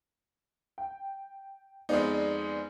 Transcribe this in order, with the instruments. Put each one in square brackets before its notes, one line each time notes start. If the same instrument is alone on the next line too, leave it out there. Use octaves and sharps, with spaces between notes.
[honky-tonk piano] G5
[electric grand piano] F2 G#3 D#4 [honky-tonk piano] B3 C5 D5